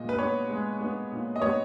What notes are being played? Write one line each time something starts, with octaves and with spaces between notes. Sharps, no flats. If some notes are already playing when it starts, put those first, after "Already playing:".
Already playing: A#2 G#3 D#5
B4
B3 C#5
G#3
B3
A#2
D#5
B3 C#5